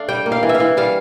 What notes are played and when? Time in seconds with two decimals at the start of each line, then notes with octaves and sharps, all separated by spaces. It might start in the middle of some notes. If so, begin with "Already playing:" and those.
Already playing: A3 D4 F5
0.09 G3 G5
0.26 A#3
0.32 F5
0.43 E3
0.49 E5
0.55 F5
0.60 E3
0.77 G3 F5